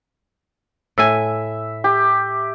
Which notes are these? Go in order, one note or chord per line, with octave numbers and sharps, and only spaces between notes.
A2 E5 G#5
G4